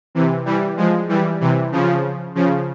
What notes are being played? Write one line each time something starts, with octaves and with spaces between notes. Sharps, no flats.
C3 E3
E3 G3
F3 G#3
E3 G3
C3 E3
C#3 F3
C#3 F3